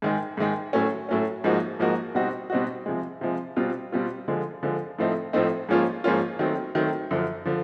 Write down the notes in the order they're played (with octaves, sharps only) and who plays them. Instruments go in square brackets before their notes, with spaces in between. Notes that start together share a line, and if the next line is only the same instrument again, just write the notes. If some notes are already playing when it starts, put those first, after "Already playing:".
[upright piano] G#2 D#3 G#3
G#2 D#3 G#3
A2 F#3 A3 C#4
A2 F#3 A3 C#4
G#2 F3 A#3 D#4 F#4
G#2 F3 A#3 D#4 F#4
B2 G3 C4 D#4 F#4
B2 G3 C4 D#4 F#4
C3 F3 G#3
C3 F3 G#3
B2 G3 C4 F4
B2 G3 C4 F4
D3 F3 G#3
D3 F3 G#3
A2 F3 A3 C4 D#4
A2 F3 A3 C4 D#4
G#2 F3 A#3 C#4 F4
G#2 F3 A#3 C#4 F4
D#3 F#3 A3 C4
D#3 F#3 A3 C4
F#2 D3 F3
D3 F3